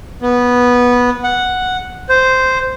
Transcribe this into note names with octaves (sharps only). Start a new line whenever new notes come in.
B3
F#5
C5